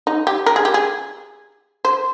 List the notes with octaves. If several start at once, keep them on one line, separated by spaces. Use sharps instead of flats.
D#4
G4
A#4
G#4
G4
G#4
C5